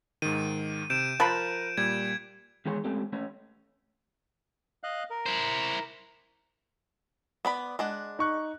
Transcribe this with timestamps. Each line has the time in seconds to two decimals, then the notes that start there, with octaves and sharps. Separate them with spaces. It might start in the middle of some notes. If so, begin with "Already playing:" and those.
0.22 G#2 D#3 D#7
0.90 C3 G6 D7 E7
1.20 F3 A#4 B5 F#6
1.77 A#2 G3 G#6
2.65 E2 D#3 G#3 G#4 C#5 C6
2.84 G#3 A3 C4 C#4 G4 A4
3.13 A3 C#4 C#5
4.84 D#5 F5 F#6
5.10 A#4
5.26 E4 C5
7.45 B3 D5 B5
7.79 G#3 D4 F#5
8.19 D#4 C#6 F#6